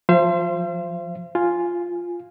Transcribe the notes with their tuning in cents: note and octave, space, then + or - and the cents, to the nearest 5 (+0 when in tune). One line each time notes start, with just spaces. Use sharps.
F3 +20 C5 +0 F5 -45
F4 +0 G#5 +0